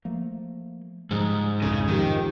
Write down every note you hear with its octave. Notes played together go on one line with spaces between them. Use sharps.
F3 A3 A#3
G#2 C#3 F3 G3
C2 F2 C#3
D#3 F3 G4